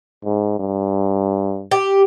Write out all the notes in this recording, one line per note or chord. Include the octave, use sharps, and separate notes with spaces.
G#2
G2
G4